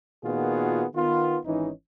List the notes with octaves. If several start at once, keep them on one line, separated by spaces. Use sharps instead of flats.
A#2 D#3 B3 F4 F#4 G#4
D#3 B3 F4
G#1 E3 C#4 D#4